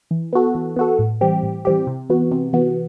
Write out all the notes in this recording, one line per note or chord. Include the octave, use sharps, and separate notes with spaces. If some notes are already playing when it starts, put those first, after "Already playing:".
E3
B3 F#4 A4
E3
B3 F#4 A4
A2
E3 G3 C4 G4
A2
E3 G3 C4 G4
C3
E3 B3 F#4
C3
E3 B3 F#4